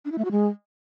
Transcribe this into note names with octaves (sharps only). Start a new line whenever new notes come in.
D4
E4
A3
F#4
G#3